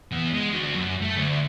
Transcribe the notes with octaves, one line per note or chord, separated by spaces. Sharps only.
E3 B3
G#3
D2 F#4
F#2
A3
D2